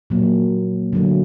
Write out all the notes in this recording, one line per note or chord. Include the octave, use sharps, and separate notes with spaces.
A#2 F#3 A#3
D3 F#3 A3